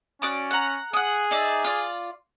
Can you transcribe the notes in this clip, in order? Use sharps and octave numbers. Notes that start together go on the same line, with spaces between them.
C#4 F#4 D5 D#6
F#5 A#5
G#4 F#5 D#6
D#4 D5 E5
F4 D5